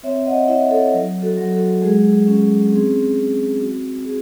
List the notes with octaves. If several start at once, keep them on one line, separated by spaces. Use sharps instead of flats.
C4 C#5 E5
D#5 F#5
E4 C#5 E5
A4 C#5
F#3
F#4 A4
F#3
F#4 A4
G#3 G#4
C#4
C4 G#4
C4
F#4
F#4 G#4